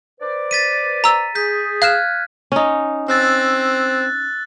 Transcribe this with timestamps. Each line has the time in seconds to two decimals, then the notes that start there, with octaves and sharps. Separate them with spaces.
0.20 B4 C5 D5
0.51 A6 B6 D#7
1.04 A#5 E6
1.35 G#4 G6 B6
1.82 F5 F6 F#6 G#6 E7
2.52 C#4 D#4
3.08 C4 E6 F#6 A6